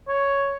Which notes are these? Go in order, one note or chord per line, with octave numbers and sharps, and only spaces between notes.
C#5